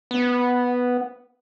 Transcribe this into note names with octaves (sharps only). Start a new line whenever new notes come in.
B3